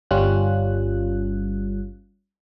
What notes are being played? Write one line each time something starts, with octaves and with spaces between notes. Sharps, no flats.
G1 G3 C#4 F4 F#6